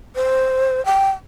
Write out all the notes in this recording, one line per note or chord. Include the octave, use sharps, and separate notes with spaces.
C5
G5